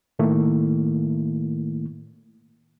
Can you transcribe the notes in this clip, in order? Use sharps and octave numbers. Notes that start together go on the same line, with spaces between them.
A2 D#3 A3 A#3 E4